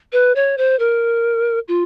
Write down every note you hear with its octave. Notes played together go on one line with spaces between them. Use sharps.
B4
C#5
C5
A#4
F4